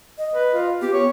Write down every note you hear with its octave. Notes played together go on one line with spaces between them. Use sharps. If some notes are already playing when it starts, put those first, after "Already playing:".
D#5
B4
F4
B3 G4
C#5